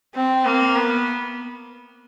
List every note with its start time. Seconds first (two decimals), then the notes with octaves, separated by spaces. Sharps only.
0.15 C4
0.45 A#3
0.76 B3